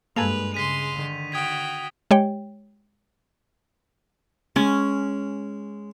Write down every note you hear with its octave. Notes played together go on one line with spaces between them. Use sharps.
G2 G#3 A#3 A4 B4 G#5 F7
C#3 G#3 C6 B6 D#7
D3 D#3
F#4 G5 D#6 G#6 B6
G#3 G4 C#5 G5
G#3 C#4